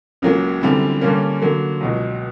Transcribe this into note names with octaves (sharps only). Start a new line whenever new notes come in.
C#2 C#3 F#3 A#3
F#2 D3 G3 C4 E4
G2 D3 G3 A#3 C#4
D3 F#3 A#3
C#2 B2 F#3